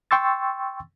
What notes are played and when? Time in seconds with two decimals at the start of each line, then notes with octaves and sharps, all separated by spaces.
0.11 G5 C6 C#6 E6 A6